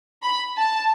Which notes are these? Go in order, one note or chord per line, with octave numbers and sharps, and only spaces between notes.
B5
A5